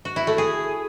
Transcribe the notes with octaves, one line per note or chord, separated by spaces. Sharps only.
F#4
E4
A3
G#4